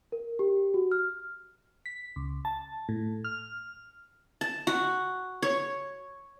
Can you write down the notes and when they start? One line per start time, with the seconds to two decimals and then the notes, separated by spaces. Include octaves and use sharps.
0.12 A#4
0.39 G4
0.74 F#4
0.92 F6
1.86 B6
2.16 C#2
2.45 A5
2.89 A2
3.25 F6
4.41 A5
4.67 F#4
5.42 C#5